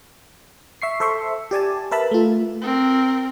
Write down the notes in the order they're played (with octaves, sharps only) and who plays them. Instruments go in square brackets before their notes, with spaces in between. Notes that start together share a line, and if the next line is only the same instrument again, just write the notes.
[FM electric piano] E5 C#6 C7
A4 C5 E5 C6 C#6
G4 D5 G#5 A5
A#4 B4 E5 A5 B5
A3 F4
[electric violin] C4 A#4